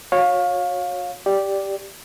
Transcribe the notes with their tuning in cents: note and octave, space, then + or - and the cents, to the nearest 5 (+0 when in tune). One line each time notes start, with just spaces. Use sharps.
F#4 -30 C#5 -10 F5 +25
G4 +0 D5 -5